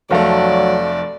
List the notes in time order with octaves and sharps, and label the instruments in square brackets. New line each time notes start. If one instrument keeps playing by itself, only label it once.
[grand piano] F1 A3 [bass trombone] F#3 [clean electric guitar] A4 F5 [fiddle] D5